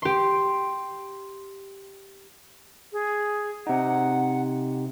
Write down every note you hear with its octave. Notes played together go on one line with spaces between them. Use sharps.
G4 C6
G#4
C3 D#4 F#5